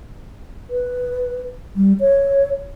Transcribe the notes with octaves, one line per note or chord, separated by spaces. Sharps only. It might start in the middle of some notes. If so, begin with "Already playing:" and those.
B4
G3
C#5